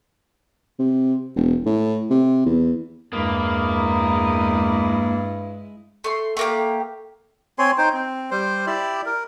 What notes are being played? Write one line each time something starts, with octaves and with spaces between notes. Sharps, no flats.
C3
E1
A2
C3
E2
E2 G2 G#3 A#3 E4 B5 D#6
A3 C6
A3 A#3 G4
C4 C#5 G#5 C6
D#4 C5 G5
C4
G3 C5
E4 G4 D5
A#4